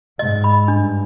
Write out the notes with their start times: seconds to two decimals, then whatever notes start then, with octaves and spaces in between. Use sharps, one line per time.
0.19 G#2 D#5
0.44 B5
0.68 G2 D4